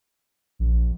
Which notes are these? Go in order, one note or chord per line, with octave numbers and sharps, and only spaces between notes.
A#1